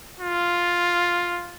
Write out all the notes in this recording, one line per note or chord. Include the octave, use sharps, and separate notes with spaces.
F4